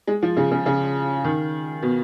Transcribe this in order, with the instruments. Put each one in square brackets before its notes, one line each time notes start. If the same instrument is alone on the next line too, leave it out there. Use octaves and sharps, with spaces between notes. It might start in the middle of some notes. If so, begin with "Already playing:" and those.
[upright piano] G#3
F3
C#3
C#3
C#3
D#3
B2